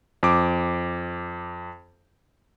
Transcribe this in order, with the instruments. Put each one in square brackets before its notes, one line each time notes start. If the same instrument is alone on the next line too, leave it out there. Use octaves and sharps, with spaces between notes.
[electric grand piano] F2 D6